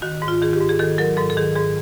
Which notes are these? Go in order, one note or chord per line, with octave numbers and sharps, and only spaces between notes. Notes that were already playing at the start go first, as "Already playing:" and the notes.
D#3 F#4
G#2
F4
D#3 G#4
G4
G#2
G#4
D#3 A4
F#3 A#4
G#2 A4
A4
D#3 G#4
G#2 G#4